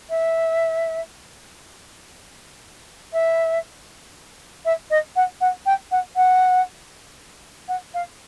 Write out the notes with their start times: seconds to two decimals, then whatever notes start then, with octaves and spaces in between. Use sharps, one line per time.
0.10 E5
3.13 E5
4.65 E5
4.90 D#5
5.16 F#5
5.41 F#5
5.66 G5
5.91 F#5
6.16 F#5
7.68 F#5
7.94 F5